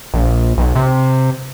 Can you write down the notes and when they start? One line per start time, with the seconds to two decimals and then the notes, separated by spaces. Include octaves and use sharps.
0.14 A#1
0.58 B1
0.75 C3